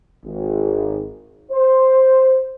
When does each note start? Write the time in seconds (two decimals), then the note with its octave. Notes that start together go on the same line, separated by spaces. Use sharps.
0.25 G#1
1.52 C5